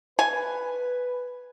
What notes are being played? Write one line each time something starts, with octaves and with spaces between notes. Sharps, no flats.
B4 G#5